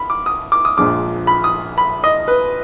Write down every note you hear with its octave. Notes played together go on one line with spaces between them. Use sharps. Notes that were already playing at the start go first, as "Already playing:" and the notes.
Already playing: B5
D6
D#6
D6
D#6
A#1 A#2 F3 G#3 D4 D6
B5
D#6
B5
D#5
B4